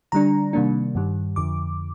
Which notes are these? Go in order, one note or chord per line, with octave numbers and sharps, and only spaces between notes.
D3 G3 D4 A#5
C3 D#3 G3 A#3 D4
G2 D#3 G3
F2 D3 F3 D6